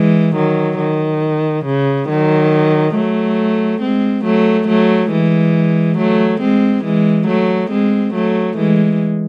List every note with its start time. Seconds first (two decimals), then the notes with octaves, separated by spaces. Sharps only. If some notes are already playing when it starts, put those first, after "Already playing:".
Already playing: E3 G#3
0.35 D#3 F#3
0.79 D#3
1.65 C#3
2.09 D#3 F#3
2.95 F#3 A3
3.82 G#3 C4
4.25 F#3 A3
4.68 F#3 A3
5.11 E3 G#3
5.98 F#3 A3
6.41 G#3 C4
6.84 E3 G#3
7.27 F#3 A3
7.71 G#3 C4
8.14 F#3 A3
8.57 E3 G#3